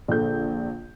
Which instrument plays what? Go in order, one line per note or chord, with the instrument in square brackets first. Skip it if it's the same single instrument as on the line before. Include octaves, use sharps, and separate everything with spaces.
[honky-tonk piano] A#1 D3 G6